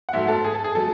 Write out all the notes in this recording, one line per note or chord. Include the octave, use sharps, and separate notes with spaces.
F#5
G#2 F#3 A3 E5
A4
G#4
A4
G#4
F#3 A3 A4